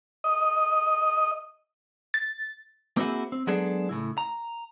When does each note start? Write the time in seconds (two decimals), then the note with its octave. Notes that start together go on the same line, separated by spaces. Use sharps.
0.24 D#5
2.14 A6
2.97 A#3 C4 D#4 E4 F#4 G#4
3.32 C4
3.47 F#3 G#3 B3 D4 G#4 A4
3.89 A2 C#3 E4
4.18 A#5